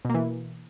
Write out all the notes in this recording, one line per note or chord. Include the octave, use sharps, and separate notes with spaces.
B2 E3 A#3